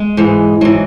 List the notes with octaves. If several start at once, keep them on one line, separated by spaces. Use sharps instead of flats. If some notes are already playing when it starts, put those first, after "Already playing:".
Already playing: G#3
G#2 E3
G#2 E3 F#3